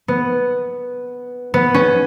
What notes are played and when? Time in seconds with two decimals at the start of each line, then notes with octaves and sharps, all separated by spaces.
0.08 B3
1.54 B3
1.74 C#4